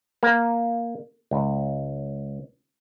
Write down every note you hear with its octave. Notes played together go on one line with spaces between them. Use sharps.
A#3
C#2